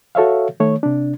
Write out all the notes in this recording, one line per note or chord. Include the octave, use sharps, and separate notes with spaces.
F#4 A4 C#5 E5 F5
D#3 A3 C#5
C3 D4